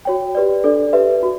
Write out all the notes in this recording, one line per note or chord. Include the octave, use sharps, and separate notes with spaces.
F#4 C#5 G5
G4 B4 D5
D4 A4 D5
G4 B4 E5
F#4